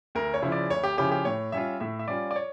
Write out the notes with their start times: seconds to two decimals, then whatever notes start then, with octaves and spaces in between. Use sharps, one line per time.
0.15 D2 A#4
0.34 C#5
0.42 C#3 F3 C#4 E4
0.52 D5
0.70 D2 C#5
0.84 G4
0.98 C#3 F3 C#4 E4 G4
1.12 G4
1.25 A2 C#5
1.52 G3 C#4 F4 E5
1.80 A2 E5
1.99 E5
2.08 G3 C#4 F4 D5
2.31 D5
2.36 C#5